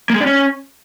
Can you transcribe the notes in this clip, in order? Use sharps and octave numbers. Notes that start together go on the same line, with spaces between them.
A#3
G#3
D4
C#4